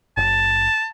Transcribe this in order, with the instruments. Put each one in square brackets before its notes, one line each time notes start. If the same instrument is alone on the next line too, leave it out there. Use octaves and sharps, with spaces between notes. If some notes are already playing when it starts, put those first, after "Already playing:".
[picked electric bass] F#1 [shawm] A5